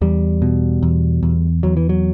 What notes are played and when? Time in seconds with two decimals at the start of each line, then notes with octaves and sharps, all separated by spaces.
0.01 E2 G3
0.42 B2
0.83 E2
1.23 E2
1.63 E2 F#3
1.77 E3
1.89 F#3